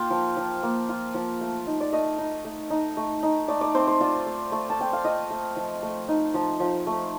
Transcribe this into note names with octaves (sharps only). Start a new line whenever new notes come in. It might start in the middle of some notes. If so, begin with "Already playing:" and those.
Already playing: A#3 F4 F5 G5
F3
F3
A#3
F4
F3
A3
D#4
D5
A3 D#5
D#4
A3
D#4
A3
D#4
A3 D5
D5
C4 C5
C5
F4 D5
A3
A3
A5
C4 G5
F5
F4 D#5
A3
F3
A3
D#4
F3
F3
A3